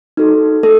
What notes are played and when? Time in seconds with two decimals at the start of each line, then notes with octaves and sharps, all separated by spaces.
0.17 D#4 F#4 A4
0.63 A3 A4